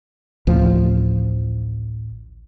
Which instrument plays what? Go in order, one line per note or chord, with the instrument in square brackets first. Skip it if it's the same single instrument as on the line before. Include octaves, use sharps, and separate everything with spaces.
[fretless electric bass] A1 D2 F3